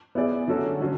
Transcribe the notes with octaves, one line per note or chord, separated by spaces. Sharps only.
B3 E4 G#4 D5
D3 F#3 C#4 F#4 A4
D3 F#3 C#4